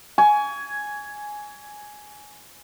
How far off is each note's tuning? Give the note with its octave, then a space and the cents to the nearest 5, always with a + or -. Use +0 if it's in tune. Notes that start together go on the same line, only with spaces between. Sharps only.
G#5 +5 C#6 +35